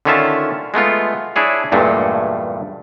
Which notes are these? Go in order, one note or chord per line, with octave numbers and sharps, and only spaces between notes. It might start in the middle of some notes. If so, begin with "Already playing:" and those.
D3 D#3 C#4 F4 E5 A5
G#3 A3 B3 F4
D4 E4 G#4 C#5
E2 G2 A#2 G#3 A3